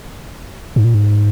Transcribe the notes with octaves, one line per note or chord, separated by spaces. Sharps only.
G#2
A#2
G#2